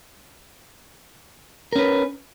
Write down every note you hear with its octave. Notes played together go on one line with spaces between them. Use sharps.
C#4 A#4 B4